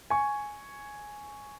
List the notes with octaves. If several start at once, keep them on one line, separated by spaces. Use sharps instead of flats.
G#5 C#6